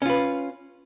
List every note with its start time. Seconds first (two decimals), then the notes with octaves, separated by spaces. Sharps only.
0.02 C#4
0.06 F4
0.09 B4